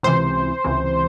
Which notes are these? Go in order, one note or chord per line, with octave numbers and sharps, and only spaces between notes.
C#2 C3 E3 C5
C#2 C3 E3